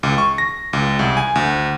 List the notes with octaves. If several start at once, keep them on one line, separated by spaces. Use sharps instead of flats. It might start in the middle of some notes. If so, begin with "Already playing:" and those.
C#2
C#6
A#6
C#2
C2
G#5
D2